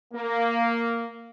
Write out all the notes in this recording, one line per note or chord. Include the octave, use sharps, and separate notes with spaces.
A#3